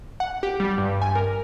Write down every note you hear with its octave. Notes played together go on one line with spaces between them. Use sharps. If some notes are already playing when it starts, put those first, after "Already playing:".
F#5
G4
G3
G2
G#5
A#4